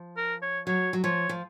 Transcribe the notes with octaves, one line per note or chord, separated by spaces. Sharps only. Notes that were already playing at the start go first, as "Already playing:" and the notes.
Already playing: F3
A#4
C#5
F#3 C#5
F#3
F3 C#5
F3